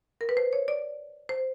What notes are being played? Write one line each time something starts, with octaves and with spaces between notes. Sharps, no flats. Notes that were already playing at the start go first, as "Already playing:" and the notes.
A#4
B4
C5
C#5
D5
C5